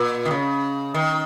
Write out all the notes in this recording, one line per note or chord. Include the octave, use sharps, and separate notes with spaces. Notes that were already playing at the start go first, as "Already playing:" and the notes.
Already playing: A#2
D#3
C#3
D#3